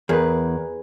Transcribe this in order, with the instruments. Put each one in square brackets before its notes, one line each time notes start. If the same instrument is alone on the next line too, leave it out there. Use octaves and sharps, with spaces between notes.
[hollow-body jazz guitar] E2 [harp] G#4 B4 [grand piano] A#4